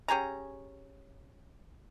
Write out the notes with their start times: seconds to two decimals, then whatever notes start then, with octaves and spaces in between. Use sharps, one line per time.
0.08 C#4 G4 G#4 A#5